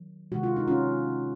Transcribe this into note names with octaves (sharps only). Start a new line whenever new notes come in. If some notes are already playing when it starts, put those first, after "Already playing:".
Already playing: D#3 F#3
C3 D#3 G#3 F#4
F4
D#4
C#4 F4